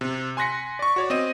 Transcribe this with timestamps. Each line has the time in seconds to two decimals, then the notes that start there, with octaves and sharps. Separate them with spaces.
0.01 C3
0.37 G#5 C6 F#6 A#6 B6 C#7
0.79 D5 C#6
0.96 F#4 C#5 D5
1.10 C4 D#5 D#7